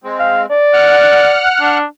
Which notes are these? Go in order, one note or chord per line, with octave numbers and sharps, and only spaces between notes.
G#3 C4
F5
D5
F#5 F6 F#6
D4